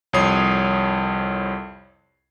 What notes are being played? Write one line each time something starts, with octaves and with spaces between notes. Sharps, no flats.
C2 F2 C#5 D#6 C7